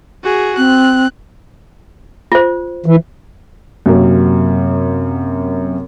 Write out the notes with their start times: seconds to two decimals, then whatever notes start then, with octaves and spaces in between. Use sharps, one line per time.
0.24 F#4 G#4
0.57 C4 F#6
2.32 F4 C5
2.86 E3
3.86 F#2 C3 F#3 A#3